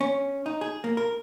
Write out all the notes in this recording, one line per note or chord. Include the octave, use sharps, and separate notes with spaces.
C#4
D#4
G#4
A#3
A#4